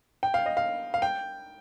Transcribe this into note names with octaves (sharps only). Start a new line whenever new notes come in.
G5
F5
D#5
F5
F5
G5